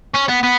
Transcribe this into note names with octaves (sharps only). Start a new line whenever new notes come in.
C#4
B3
B3